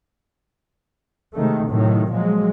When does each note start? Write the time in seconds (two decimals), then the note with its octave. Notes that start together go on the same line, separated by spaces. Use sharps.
1.36 C3 D#3 G#3 A3
1.68 A2 C3 D#3 F#3
2.11 A#2 F3 F#3 G#3